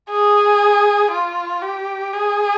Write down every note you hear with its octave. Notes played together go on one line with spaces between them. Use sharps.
G#4
F4
G4
G#4